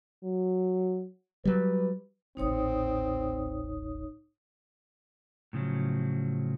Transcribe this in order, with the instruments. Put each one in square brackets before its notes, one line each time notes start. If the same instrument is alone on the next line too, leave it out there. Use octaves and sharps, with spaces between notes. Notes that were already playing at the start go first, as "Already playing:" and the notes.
[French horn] F#3
[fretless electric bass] F#3 G3 [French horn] B4
[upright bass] D#1 A1 [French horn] C4 [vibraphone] D#4 C#5 D#6
[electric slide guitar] A2 C#3 F3 F#3